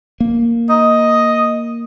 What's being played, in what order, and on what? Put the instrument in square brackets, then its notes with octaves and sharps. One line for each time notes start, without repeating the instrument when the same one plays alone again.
[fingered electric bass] A#3
[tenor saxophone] D#5